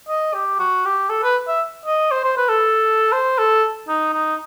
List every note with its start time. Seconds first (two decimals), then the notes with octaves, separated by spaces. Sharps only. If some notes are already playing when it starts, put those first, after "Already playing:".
0.08 D#5
0.34 G4
0.59 F#4
0.85 G4
1.10 A4
1.23 B4
1.48 E5
1.86 D#5
2.11 C5
2.24 C5
2.37 B4
2.49 A4
3.12 C5
3.38 A4
3.88 D#4
4.14 D#4